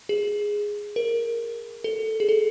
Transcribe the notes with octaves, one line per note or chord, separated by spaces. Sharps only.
G#4
A#4
A4
G#4
A4